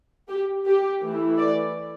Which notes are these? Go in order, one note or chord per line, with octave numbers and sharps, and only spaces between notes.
G4
G4
E3 A3 E4
D5